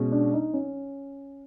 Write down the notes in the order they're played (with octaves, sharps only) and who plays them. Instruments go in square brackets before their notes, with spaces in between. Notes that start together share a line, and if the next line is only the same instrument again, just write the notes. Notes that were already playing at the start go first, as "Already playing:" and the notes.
Already playing: [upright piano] B2 G#3 C#4
[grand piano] D4
D#4
C#4